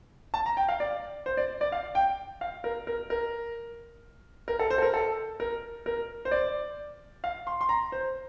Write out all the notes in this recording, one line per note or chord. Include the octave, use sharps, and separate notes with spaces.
A5
A#5
G5
F5
D5
C5
D5
D5
F5
G5
F5
A#4
A#4
A#4
A#4
A4
C5
A4
A#4
A4
A#4
A#4
C5
D5
F5
C6
C6
A#5
C5